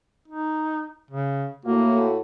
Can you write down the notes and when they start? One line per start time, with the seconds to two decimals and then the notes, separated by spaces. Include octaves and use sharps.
0.28 D#4
1.11 C#3
1.65 A2 A#3 F#4